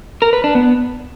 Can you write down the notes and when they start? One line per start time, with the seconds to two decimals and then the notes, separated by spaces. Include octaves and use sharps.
0.22 A#4
0.33 B4
0.44 D4
0.55 B3